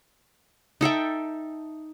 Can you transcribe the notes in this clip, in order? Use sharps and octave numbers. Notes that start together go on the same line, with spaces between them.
D#4 A4 E5 G5